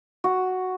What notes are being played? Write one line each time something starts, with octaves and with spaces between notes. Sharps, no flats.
F#4